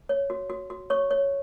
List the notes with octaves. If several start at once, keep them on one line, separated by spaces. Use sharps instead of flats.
C#5
F#4
F#4
F#4
C#5 C#6
C#5